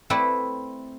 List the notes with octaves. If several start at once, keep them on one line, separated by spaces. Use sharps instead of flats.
A3 C4 E4 B4 C5 D5